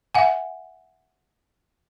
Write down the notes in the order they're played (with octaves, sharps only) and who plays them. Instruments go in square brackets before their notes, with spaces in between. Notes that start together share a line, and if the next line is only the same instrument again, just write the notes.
[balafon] E5 F#5 G#5